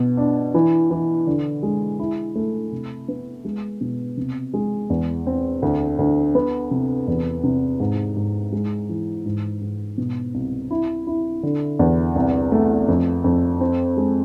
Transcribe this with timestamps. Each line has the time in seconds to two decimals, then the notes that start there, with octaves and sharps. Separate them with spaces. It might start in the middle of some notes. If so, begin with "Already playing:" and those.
Already playing: B2
0.17 D4
0.54 E3
0.91 E3
1.27 D3
1.63 G#3
1.99 E4
2.35 A3
2.72 C3
3.08 B3
3.45 G#3
3.81 B2
4.17 C3
4.54 G#3
4.90 E2
5.27 C4
5.62 D2
5.99 D2
6.35 B3
6.71 C3
7.08 E2
7.43 C3
7.80 G#2
8.17 G#2
8.52 G#3
8.89 E3
9.25 G#2
9.61 G#2
9.98 B2
10.34 C2
10.71 E4
11.07 E4
11.43 D3
11.79 E2
12.16 C2
12.52 A3
12.88 F2
13.24 F2
13.61 C4
13.97 G#3